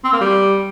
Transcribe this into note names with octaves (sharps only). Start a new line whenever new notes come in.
C4
A#3
G3